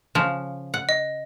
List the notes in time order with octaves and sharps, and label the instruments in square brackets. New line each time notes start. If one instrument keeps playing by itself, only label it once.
[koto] C#3 F3
F#5
[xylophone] D#5